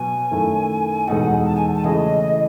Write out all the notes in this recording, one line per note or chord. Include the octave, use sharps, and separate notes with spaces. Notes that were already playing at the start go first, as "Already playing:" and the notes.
Already playing: B2 F#3 B3 G#5
F#2 D#3 A3 E4 A4
E2 B2 G#3 D#4 A4 F#5
A5
G#5
A5
C#3 E3 A3 E4 G#4 D#5